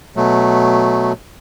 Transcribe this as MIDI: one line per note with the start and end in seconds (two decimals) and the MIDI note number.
0.16 1.12 47
0.16 1.12 54
0.16 1.12 57